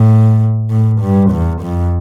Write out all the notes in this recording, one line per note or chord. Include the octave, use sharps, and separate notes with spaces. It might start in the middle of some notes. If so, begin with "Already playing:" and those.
Already playing: A2
A2
G2
E2
F2